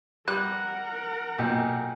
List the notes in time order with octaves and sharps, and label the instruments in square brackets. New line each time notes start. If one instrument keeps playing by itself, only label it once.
[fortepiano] G3 [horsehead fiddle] A#4 F#5 [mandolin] F#6
[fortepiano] B1 A#2 [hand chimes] G5 G#5 G6